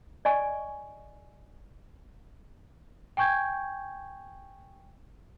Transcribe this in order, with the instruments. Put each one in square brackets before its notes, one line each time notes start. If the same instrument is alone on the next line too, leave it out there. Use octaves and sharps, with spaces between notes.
[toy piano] D5 D#5 G#5 C#6
[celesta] G5 G#5 C#6 G6 G#6